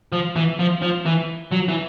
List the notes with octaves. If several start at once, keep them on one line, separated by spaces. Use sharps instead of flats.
F3
E3
F3
F3
E3
F#3
E3